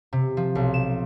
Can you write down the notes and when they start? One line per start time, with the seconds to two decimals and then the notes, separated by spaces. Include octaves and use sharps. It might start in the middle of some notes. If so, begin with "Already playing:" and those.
0.13 C3
0.37 F3
0.55 B1
0.74 E7